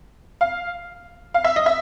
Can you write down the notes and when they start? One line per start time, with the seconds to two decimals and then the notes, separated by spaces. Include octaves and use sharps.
0.41 F5
1.34 F5
1.44 E5
1.56 D#5
1.66 E5